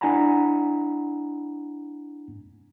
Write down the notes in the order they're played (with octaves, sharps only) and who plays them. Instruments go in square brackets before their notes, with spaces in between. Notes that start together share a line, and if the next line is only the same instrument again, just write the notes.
[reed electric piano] D4 E4 F#5 G#5 A#5 B5